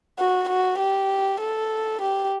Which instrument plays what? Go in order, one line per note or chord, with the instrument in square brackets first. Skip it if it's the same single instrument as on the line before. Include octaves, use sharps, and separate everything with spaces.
[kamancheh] F#4
F#4
G4
A4
G4